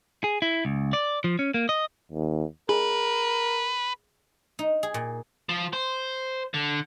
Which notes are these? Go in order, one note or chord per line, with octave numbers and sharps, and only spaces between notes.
G#4
E4
C#2
D5
F3
C#4
A#3
D#5
D#2
G#4 A#4 B4
D#4
G#4
A#2
F3
C5
D3